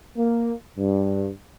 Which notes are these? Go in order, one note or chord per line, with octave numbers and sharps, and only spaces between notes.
A#3
G2